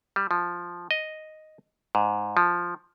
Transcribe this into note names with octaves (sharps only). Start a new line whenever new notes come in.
G3
F3
D#5
G#2
F3